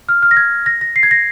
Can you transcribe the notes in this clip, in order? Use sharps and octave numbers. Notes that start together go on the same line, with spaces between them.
F6
F6
A#6
G#6
A#6
A#6
C7
G#6
A#6